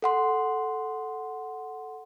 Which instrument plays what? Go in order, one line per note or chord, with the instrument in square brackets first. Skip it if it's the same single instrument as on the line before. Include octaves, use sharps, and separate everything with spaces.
[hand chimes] A4 F#5 C6